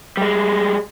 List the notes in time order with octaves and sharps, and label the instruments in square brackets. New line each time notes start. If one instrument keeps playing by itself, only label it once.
[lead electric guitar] G3 G#3